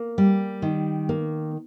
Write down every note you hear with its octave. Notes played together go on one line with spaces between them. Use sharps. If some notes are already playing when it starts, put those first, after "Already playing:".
Already playing: A#3
G3
D#3
A#3